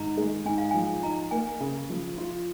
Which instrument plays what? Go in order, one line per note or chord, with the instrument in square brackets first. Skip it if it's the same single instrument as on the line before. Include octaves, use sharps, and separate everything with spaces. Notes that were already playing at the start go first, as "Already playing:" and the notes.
Already playing: [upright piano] G#2 D#3 [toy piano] A#5
[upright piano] G#3
[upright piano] G#2 [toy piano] G#5
[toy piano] F5
[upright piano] F3 [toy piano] G#5
[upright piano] D#4 [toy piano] A#5
[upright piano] A#3 [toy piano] G#5
[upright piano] C#3
F3
F4